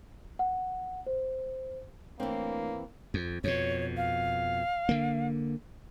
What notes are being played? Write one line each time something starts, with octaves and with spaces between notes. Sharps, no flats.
F#5
C5
E3 A3 A#3 C4 D4 C#5
F2
F2 B2 C#5
F5
D3 A#3